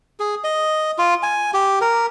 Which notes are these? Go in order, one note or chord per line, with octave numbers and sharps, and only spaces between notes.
G#4
D#5
F4
G#5
G4
A#4